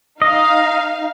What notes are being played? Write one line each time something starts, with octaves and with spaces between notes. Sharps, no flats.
D#4 D#5 F5